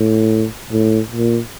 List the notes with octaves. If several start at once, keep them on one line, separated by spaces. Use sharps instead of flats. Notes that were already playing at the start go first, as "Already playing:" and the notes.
Already playing: A2
A2
A#2